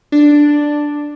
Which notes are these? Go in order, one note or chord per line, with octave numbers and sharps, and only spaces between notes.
D4